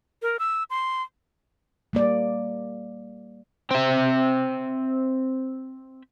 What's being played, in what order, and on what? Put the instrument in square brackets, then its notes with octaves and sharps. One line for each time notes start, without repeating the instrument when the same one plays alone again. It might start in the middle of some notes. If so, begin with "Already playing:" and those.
[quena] A#4
E6
C6
[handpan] G3 A#3 D5
[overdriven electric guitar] C4 E5